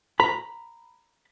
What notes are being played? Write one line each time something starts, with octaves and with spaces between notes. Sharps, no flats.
A#5 B5